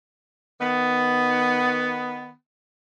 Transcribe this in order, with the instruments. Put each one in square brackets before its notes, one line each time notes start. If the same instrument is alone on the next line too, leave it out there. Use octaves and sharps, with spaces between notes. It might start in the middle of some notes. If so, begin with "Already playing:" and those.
[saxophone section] D#3 B3